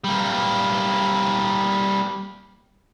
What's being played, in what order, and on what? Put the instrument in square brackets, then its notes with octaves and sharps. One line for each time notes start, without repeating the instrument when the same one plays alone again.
[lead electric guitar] G3 A#3